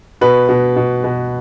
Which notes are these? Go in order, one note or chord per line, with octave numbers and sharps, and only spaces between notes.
B2 B4
B2
B2
B2